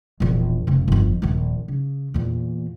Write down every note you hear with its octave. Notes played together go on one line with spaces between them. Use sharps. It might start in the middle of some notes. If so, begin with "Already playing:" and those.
E1 A#1
F1 C#3
G1 F2
D#1 A#1
C#3
E2 A#2